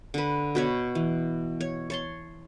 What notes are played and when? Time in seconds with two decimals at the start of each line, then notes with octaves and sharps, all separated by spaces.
0.14 D3 B4
0.55 B2 B4 C#5
0.95 E3
1.61 C#5
1.90 C#5 A5 C6